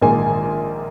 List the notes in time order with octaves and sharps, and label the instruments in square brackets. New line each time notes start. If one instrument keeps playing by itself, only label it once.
[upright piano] A#1 G#2 D#3 A#3 G#5